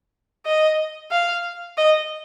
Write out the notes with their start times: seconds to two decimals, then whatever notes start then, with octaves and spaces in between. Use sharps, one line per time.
0.46 D#5
1.11 F5
1.77 D#5